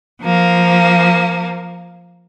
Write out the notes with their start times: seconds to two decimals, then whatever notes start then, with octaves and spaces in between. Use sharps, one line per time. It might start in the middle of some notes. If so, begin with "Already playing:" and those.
0.21 F3 A#3